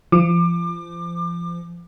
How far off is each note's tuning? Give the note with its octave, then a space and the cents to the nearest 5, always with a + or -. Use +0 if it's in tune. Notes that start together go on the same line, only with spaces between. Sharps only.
F3 -30 D6 +30